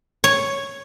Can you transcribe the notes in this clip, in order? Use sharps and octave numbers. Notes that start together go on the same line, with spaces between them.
C#5